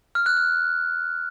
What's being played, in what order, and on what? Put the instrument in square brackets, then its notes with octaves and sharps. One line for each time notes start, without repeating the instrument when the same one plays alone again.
[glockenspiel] F6
F#6
F6